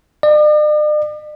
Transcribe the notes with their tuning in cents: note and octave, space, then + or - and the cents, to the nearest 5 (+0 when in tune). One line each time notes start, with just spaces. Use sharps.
D5 +45